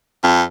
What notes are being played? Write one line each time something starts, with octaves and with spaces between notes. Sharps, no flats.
F2